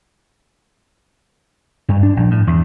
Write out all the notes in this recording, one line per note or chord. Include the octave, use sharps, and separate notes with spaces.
G2
D4
A#1
A2
E2